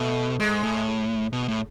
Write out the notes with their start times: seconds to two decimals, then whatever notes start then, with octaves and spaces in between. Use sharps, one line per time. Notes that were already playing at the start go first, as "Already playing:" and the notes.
Already playing: B2 A3
0.40 G#2 G#3
0.63 A2
1.33 B2
1.48 A2